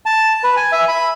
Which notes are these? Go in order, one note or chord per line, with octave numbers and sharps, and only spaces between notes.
A5
B4
G#5
E5
B5